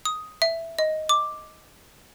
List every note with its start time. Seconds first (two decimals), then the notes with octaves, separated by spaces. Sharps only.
0.05 D#6
0.42 E5
0.79 D#5
1.09 D6